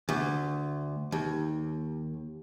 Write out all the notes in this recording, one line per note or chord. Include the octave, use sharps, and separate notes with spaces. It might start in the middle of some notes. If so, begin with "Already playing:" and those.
D2
D#2